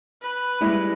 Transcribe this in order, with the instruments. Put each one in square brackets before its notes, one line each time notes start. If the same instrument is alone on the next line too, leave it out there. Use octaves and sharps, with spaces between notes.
[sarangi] B4
[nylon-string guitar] G3 G#3 E4